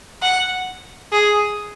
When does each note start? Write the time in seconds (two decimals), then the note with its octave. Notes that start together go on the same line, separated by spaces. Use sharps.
0.22 F#5
1.12 G#4